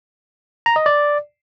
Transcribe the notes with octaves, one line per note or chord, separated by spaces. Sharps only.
A#5
D#5
D5